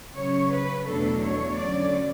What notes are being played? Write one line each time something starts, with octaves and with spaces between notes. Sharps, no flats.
C#3 F#3 C#4 C#5
B4
E2 B2 F#3 A3 D4 A4
C#5
D3 F#3 C#4 D5